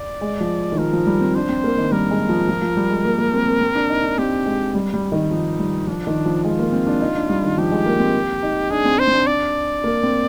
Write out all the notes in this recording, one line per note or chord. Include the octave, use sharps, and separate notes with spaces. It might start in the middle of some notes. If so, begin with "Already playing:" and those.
Already playing: D5
G#3
F3
D#3
F3 A#4
F3
G3
C4
D4 C5
C4
A#3
D#3
G3 A#4
G#3
F3
F3
F3
G3
G#3
A#3
A#3
C4
C4
C4
D4
D#4
D4
C4 G4
G#3
G3
G3
D#3
F3 D#4
G3
F3 D4
D#3
F3
G#3 F4
A#3
C4
D4
D#4
D4
G3
D#3
F3 G4
G#3
A#3
C4
D#4
D4 G#4
C4
D4 C5
C4
D4
D5
A#3
C4